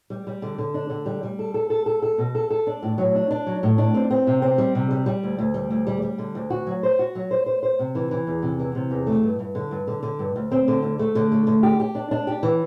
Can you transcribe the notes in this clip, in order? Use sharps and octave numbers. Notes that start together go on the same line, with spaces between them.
G3
G3
D3
D3
D4
D3
G3
G3
A4
A4
A4
A4
A4
B2
A4
A4
D4
A2
F#3
D4
D4
F#3
A2
D4
C4
C4
C3
C4
G3
C3
G3
G3
D2
D2
G3
D2
G3
G3
D3
D2
F#4
F#3
C5
F#4
F#3
C5
C5
C5
C3
E3
E3
E2
C3
E3
C3
E2
A3
G2
G2
D3
G2
D3
D3
G2
D2
C4
D3
D2
A3
D3
A3
D3
G4
G4
D4
D4
G4
E3